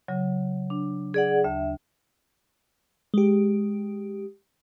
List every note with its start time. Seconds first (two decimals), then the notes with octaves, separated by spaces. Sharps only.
0.08 C#3 F#3
0.70 D4
1.14 G#4 D5 F#5
1.44 D2 E5
3.14 G#3 G4